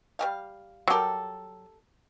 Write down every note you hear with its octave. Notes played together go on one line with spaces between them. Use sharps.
G3 C4 F5
F#3 G3 G4 A4 A#4